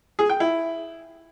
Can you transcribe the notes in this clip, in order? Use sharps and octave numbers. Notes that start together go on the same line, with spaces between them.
G#4
G5
E4